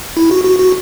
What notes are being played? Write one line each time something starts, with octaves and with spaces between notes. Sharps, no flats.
E4
F#4
F#4
F#4